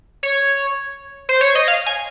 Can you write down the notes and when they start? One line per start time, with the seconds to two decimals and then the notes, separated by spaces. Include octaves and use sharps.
0.23 C#5
1.29 C5
1.41 C#5
1.55 D#5
1.68 F5
1.86 G#5